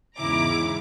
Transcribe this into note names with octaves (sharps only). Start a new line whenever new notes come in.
E2 G#2 C#3 E4 A#5 D6